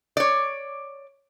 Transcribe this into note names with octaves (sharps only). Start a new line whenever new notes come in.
C#5 D5